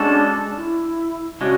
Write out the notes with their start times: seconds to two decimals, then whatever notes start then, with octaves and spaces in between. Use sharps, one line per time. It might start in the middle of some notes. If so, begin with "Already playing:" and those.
Already playing: G#3 C#4 D4 F#4 A4
0.57 E4
1.41 C#3 G#3 D4 F#4